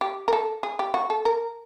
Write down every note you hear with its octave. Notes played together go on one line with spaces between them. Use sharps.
G4
A#4
A4
G#4
G4
F#4
A4
A#4